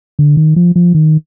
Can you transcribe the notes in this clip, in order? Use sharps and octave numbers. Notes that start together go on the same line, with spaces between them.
D3
D#3
F3
F3
D#3